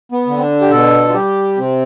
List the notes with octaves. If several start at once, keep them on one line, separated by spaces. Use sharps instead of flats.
B3
D3
C4
D4
G4
B2 A4
F4
G3 G4
C3 C4